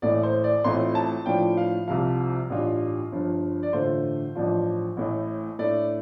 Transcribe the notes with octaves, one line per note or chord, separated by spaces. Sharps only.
A1 A2 A3 D5
C5
D5
A1 A2 A3 C4 F4 C6
A5
A2 F3 D4 F4 G5
F5
C2 C3 F3 F5
A1 G2 G3 F4
G1 G2 F3
D5
A1 G2 D3 A3 F4 C5
A1 G2 F3 D4 F4
A1 A2 A3
A2 A3 D4 D5